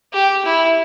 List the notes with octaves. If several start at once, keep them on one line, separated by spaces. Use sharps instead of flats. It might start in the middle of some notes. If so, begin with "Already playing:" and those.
G4
E4